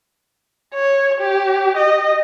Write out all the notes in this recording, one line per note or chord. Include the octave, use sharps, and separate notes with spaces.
C#5
G4
D#5